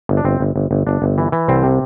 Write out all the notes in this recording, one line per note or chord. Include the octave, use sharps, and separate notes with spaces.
G1
D4
G1 C4
G1
G1
G1
G1 D4
G1
E3
E3
C2 C4
C3